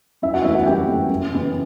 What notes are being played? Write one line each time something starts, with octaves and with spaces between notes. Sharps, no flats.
F#2 E4 E5
F#4 F#5
E3 A3 E4 E5
F#4 F#5
F#2 G4 G5
E3 A3
F#2
C#3 E3